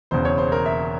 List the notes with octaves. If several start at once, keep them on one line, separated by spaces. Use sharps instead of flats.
E1 E2 C#3 C5
C#5
C5
A#4
E5